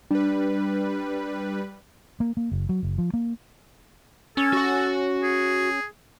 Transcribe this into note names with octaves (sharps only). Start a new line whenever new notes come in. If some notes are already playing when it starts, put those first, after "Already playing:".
G3 D4 B4
A#3
A#3
F#1
F#3
F#1
F3
A#3
C#4 A4
F#4 F#5
G#4